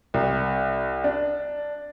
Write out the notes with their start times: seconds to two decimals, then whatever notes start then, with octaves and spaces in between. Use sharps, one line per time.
0.14 C2
1.04 D4